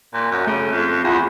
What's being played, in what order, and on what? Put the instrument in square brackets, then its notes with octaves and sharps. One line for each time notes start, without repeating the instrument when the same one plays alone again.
[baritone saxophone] A#2
F#2
[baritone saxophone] C#3 [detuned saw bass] A3
[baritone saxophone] F2
[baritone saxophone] E2 [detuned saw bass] F4